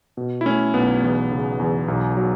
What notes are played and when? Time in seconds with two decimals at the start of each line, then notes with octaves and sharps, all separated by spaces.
0.17 B2
0.41 E4
0.45 A3 C#4
0.73 B1 B3
1.02 E2
1.32 C#3
1.60 E2
1.88 B1
2.17 F#3